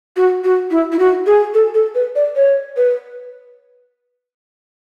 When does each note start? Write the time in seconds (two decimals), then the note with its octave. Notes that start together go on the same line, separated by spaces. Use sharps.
0.16 F#4
0.44 F#4
0.71 E4
0.92 E4
0.99 F#4
1.26 G#4
1.54 A4
1.74 A4
1.95 B4
2.16 D5
2.36 C#5
2.77 B4